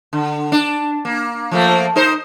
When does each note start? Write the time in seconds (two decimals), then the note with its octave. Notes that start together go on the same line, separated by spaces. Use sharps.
0.13 D3
0.52 D4
1.05 A#3
1.51 F3 A3 A#3
1.96 D#4 A#4 C5